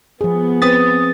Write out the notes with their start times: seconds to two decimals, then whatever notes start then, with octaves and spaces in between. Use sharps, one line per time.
0.21 F3 B3 G#4
0.62 C4 B4 D#6 A6